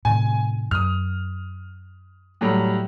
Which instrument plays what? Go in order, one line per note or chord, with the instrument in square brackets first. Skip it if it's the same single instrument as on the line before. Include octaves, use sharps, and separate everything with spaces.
[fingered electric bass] A2 C3 D#3 [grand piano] G#5
[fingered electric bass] F#2 [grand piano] D#6 F6
[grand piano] A2 F#3 G3